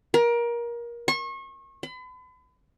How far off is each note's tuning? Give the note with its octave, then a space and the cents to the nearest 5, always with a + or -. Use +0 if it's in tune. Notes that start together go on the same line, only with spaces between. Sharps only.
A#4 +25
C#6 -35
B5 +40